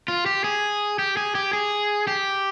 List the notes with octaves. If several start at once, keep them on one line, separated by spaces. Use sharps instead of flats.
F4
G4
G#4
G4
G#4
G4
G#4
G4